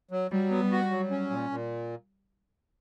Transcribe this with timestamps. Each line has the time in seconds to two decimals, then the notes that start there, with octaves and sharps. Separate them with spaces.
0.11 F#3
0.31 F#3 G3
0.51 B3
0.61 G3
0.72 F#4
0.91 F#3
1.11 C#4
1.30 A#2
1.50 A#2